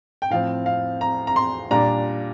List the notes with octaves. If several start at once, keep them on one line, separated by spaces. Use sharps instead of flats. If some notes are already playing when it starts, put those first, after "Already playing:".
G5
A2 F3 C4 F5
F5
A#5
A#5
C6
A#2 G3 D4 A#5